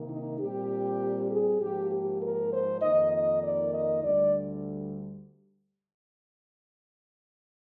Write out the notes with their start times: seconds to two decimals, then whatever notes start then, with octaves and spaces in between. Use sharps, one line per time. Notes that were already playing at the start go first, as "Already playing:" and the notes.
Already playing: C3 D#3 A#3
0.09 D#4
0.39 A#2 G3 C4 G4
1.31 G#4
1.60 G#2 F3 A#3 G4
1.91 G4
2.22 A#4
2.52 C5
2.82 F2 D#3 A#3 D#5
3.12 D#5
3.42 D5
3.73 D#5
4.03 D2 D3 G3 D5